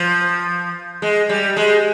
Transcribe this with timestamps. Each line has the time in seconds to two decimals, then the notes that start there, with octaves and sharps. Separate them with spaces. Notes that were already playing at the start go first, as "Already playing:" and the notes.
Already playing: F3
1.02 G#3
1.29 G3
1.57 G#3